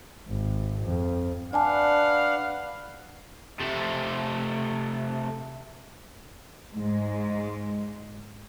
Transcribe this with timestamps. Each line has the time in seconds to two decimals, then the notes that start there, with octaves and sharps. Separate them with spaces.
0.29 G#1
0.84 F2
1.53 D4 B4 D5 F5 F#5 G#5 A5
3.60 C3 A3
6.74 G#2 G#3